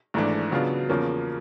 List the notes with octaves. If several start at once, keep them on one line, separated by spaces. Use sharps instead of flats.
G#1 G#2 E3 A3 D4
C#3 F#3 B3 D4 F4
E2 C#3 F3 A#3 C#4